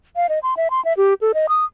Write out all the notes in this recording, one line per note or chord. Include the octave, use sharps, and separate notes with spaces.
F5
D#5
C6
E5
C6
E5
G4
A4
D#5
D#6